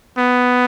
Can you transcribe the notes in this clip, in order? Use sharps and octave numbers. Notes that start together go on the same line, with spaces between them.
B3